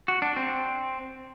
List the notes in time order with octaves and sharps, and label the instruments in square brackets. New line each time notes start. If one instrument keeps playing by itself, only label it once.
[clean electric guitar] F#4
D4
C4